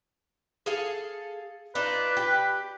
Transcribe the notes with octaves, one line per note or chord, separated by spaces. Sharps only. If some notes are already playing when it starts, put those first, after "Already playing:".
G#4 A4 F5
D4 D#4 F4 B4
G4